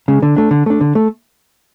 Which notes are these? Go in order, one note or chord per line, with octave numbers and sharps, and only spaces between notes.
C#3 G#3
D3
A3 D4
D3
A3 D4
D3
A3